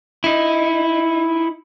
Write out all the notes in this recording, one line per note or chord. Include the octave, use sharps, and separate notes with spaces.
D#4 E4